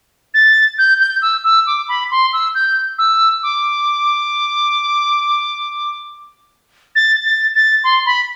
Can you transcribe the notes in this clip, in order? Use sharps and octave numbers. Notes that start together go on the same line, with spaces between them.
A6
G6
G6
E6
E6
D6
B5
C6
E6
G6
E6
D6
A6
A6
A6
C6
B5